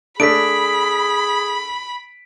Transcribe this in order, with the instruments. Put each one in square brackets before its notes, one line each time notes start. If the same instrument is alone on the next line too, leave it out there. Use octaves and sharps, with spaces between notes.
[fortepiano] A3 D4 [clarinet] G#4 [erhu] B5 [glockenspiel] B6 D7